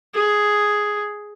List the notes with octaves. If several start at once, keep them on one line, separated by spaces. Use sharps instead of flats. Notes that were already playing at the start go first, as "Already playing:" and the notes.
G#4